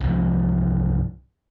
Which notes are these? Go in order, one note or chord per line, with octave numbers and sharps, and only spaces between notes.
C2 G2 F3